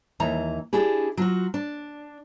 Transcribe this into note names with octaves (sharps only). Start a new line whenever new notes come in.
D#2 E3 A#5
D4 E4 G4 G#4
F#3 F4 F#4
D4